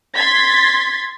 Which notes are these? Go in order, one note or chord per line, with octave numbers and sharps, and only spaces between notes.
C6 G#6 A6 B6